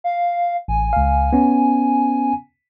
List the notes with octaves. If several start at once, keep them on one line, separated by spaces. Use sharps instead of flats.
F5
A1 G#5
C#2 F5
B3 C#4